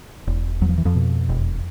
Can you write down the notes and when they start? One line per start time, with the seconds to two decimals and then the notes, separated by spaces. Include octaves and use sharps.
0.27 E1
0.61 E2 F#3
0.69 F3
0.78 E3
0.85 F2 F3
0.95 B2
1.29 E1